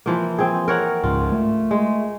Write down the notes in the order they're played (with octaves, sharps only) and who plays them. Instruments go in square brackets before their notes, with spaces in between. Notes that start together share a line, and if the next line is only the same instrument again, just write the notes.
[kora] E3 F3 A#3
C4 G#4
A#4 C#5 F#5
[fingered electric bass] C#2 G#2 [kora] F4
[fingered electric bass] A3
[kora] G#3